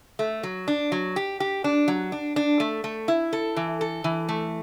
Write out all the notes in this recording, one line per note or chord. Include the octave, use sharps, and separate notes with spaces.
A3
F#3
D4
F#3
G4
G4
D4
F#3
D4
D4
A3
A3
E4
A4
E3
A4
E3
A3